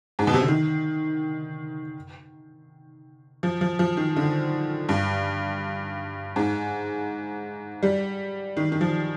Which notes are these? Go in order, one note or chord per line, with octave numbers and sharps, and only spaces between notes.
G#2
B2
C3
D3
D#3
F3
F3
F3
D#3
D3
G2
G#2
G3
D#3
D#3
F3